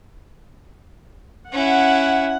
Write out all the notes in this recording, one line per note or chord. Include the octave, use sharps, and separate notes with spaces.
C#4 E4 F#5